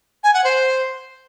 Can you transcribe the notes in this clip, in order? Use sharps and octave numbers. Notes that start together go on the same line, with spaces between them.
G#5
F#5
C5